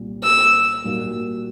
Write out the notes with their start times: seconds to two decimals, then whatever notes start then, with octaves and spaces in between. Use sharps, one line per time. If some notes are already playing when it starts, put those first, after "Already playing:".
Already playing: C2 A#2 G3 C4
0.23 E6
0.84 A#2 G3 A#3 D#4 F#4